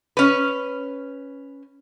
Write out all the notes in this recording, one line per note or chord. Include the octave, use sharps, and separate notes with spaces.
C#4 B4